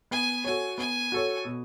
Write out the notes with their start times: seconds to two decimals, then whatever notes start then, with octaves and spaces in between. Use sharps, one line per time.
0.11 B3 G#5
0.44 F#4 A4 C#5 G#5
0.78 B3 G#5
1.12 F#4 A4 C#5
1.45 B2